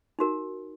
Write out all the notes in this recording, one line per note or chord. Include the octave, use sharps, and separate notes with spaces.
D#4 F#4 A#4